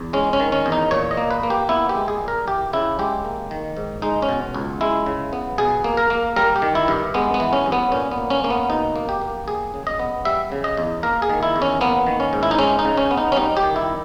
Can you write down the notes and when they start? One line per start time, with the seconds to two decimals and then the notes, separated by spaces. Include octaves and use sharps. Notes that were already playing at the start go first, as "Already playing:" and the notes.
Already playing: E2
0.13 G#3 C#4
0.33 C#4
0.40 D#3
0.52 C#4
0.66 E2
0.72 D#4
0.91 A#2 C#5
1.11 D#5
1.17 A#3
1.31 B4
1.43 A#3
1.50 G4
1.69 B3 E4
1.89 G4
1.95 G#3
2.08 G#4
2.21 A#2
2.28 A#4
2.47 E3 G4
2.73 C#3 E4
2.99 G#3 G4
3.25 A#3
3.51 D#3
3.77 G#2
4.02 G#3 D#4
4.22 C#4
4.29 B2
4.54 C#2
4.81 G#3 E4
5.06 C#3
5.33 B3
5.58 B2 G#4
5.84 A#3
5.97 A#4
6.10 A#3
6.36 G3 A#4
6.56 G4
6.62 D#3
6.75 E4
6.88 G2
7.14 G#3 B3
7.34 B3
7.40 E3
7.53 C#4
7.66 G2
7.72 B3
7.92 A#2 C#4
8.12 B3
8.18 A#3
8.30 C#4
8.44 A#3 C#4
8.50 B3
8.70 B2 D#4
8.96 A#3
9.09 G4
9.21 A#3
9.48 G3 G#4
9.74 C#3
9.87 D#5
9.99 B3
10.25 G3 E5
10.52 C#3
10.64 D#5
10.77 E2
11.03 A#3 A#4
11.22 G#4
11.29 D#3
11.43 E4
11.56 E2
11.62 C#4
11.81 A#3 B3
12.06 D#3
12.20 C#4
12.33 G#2
12.43 E4
12.51 D#4
12.59 G#3 C#4
12.79 D#4
12.85 C#3
12.98 C#4
13.11 B3
13.17 D#4
13.32 C#4
13.36 G3 D#4
13.57 G4
13.63 D#3
13.76 E4